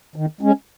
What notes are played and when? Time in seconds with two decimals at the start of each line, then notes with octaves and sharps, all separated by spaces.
0.16 D#3
0.41 G#3 C#4